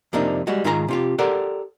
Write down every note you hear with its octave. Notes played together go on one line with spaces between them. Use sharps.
F2 C3 A#3 D4 D#4
G3 G#3 F#4
G#2 D#3 F4 G#4 A4 A#5
C3 F4 G4
G4 A4 A#4 C5 D5 F#5